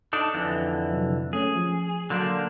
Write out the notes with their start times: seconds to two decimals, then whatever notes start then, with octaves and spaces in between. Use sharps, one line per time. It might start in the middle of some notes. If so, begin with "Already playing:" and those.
0.13 D4 D#4 A4
0.34 F2 D3 E3
0.92 C3 F#3
1.33 A3 C#4 G#4
1.56 F3
2.10 D3 F#3 A#3 D4 C6 G6